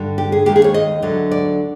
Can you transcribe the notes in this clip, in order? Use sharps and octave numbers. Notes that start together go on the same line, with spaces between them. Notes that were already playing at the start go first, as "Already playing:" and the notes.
Already playing: G2 D3 G3
G4
G#4
D#2 D#3 G#3 G4
G#4
C#5
D#5
D2 D3 F#3
D5